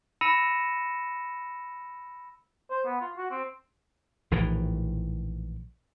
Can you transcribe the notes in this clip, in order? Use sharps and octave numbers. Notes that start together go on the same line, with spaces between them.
B5 E6 A#6 C#7 D#7 E7
C5
B3
F4
F#4
C4
A#1 A2 D#3 E3